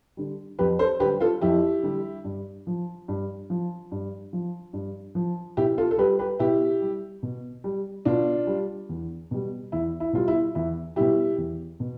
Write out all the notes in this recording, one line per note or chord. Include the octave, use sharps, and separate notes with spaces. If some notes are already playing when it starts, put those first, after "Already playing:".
D3 G3
F2 G4 B4
A4 C5
D3 G3 G4 B4
F4 A4
F2 E4 G4
D3 G3
G2
F3
G2
F3
G2
F3
G2
F3
B2 E4 G4
F4 A4
A4
G3 G4 B4
G4 B4
B2 E4 G4
G3
B2
G3
B2 D4 F4
G3
E2
B2 G3
E2 E4
E4
B2 G3 F4
E4
E2 E4
B2 G3 E4 G4
E2
B2